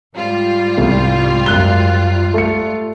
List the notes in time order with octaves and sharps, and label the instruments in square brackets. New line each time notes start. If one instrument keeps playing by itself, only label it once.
[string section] G#2 G3 F4
[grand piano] C2
F#2 F#6 G7
A3 C#7